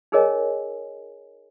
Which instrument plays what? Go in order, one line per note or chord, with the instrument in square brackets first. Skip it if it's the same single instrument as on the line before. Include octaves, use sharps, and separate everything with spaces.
[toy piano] D#4 G#4 A#4 C#5 D#5 G#5